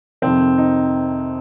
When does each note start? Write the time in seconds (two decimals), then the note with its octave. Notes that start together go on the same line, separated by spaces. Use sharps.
0.22 F2 C3 D#3 C4
0.58 D#4